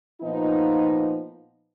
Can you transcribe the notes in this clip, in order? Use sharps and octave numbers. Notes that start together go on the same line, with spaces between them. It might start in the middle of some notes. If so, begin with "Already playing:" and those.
A#2 F3 B3 D#4